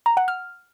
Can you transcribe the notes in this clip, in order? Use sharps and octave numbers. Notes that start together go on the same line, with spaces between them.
A#5
F#5
F6